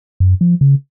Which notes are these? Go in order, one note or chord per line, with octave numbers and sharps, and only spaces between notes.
F#2
F3
C#3